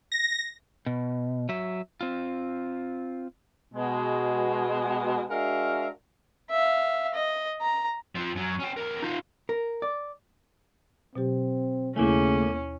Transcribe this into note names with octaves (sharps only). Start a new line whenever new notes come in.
A#6
B2
F#3 E5
C4 F4
B2 G#3
G#3 D4 F#4 A#4 E5 F5
E5 F5
D#5
A#5
F3 C4
F#2 F#3
C#4 G5
E2 A#4
D#4 F4
A#4
D5
B2 F#3 C4 G4
D#2 C#3 A3 A#3 C#4 E4 G#5